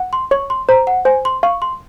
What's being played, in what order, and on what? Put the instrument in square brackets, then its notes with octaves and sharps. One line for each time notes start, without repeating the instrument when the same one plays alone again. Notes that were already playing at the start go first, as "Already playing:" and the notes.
Already playing: [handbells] F#5
[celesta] C6
[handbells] C#5 [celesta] C#6
[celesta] C6
[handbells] C5 [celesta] A#5
[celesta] F#5
[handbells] C5 [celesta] G#5
[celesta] C6
[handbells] F5 [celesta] C#6
[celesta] C6